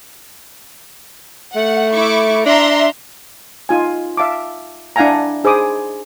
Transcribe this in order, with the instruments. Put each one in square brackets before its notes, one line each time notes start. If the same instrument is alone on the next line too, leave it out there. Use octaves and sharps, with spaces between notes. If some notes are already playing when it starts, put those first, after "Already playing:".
[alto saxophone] A3 [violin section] F#5
[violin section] E4 C#6 D6
[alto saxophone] D4 [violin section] E5 A#5 C6
[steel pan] D#4 F4 G#5
E5 F5 A5 D6
D4 E4 F5 F#5 G#5 A#5
D#4 G#4 C5 B5 D6 D#6